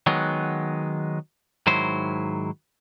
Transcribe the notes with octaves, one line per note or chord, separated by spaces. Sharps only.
D#3 F#3 G#3 B3
G#2 D#3 F#3 E4 C5